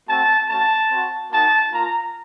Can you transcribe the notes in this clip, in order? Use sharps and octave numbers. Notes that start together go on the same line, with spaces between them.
A3 C4 F#4 A5
A3 C#4 F#4 A5
C4 F#4
A#3 D#4 F#4 A5
A#3 F4 A#5